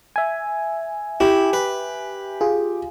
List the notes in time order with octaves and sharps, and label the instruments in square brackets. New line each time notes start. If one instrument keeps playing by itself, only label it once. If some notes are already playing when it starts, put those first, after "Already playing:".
[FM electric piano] E5 G#5
[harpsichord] E4 [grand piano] G4
[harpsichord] B4
[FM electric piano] F4 G#4